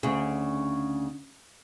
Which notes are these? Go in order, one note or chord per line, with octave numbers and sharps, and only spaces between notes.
D2 C#3